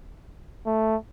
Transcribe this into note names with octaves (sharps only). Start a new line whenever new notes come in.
A3